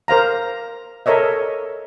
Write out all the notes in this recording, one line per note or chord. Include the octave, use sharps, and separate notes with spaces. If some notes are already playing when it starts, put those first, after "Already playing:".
A#4 C5 F5 A#5
A4 A#4 C#5 D#5 E5